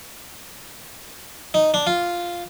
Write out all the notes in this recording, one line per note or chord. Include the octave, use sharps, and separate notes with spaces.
D#4
D4
F4